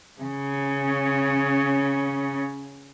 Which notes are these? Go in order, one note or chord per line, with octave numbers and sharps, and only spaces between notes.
C#3 C#4